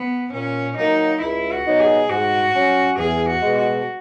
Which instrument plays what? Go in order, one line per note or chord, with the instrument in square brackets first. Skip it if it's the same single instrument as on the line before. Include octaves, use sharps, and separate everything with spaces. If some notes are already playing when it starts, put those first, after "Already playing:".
Already playing: [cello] B3
[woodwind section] A#2 [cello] C#4
[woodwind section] F#3 A#3 [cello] D#4
[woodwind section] C#2 [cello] E4
[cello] F#4
[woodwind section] B2 F#3 B3 D#4
[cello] G#4
[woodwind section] G#2 [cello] F#4
[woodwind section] F#3 C#4
[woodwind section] E2 [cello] G#4
[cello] F#4
[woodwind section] B2 G#3
[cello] F#4